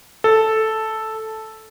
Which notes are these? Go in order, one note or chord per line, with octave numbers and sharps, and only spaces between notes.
A4